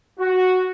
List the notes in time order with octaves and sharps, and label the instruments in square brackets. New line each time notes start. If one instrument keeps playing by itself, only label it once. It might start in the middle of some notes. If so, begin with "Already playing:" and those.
[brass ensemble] F#4